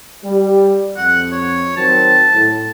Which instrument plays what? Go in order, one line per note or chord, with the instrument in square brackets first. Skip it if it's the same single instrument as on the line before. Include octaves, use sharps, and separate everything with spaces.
[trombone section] G3
[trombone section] F2 [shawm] F#5
[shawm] C#5
[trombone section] D#3 F#3 C4 [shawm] A5
[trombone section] A2